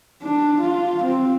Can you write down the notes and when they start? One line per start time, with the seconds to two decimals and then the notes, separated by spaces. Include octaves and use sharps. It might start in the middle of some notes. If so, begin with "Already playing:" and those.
0.22 D4
0.61 F4
1.04 C4